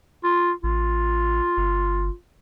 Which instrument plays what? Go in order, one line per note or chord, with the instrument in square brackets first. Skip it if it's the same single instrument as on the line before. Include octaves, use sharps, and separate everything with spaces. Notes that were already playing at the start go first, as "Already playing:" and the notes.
[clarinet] F4
[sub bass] A1 [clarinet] F4
[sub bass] G1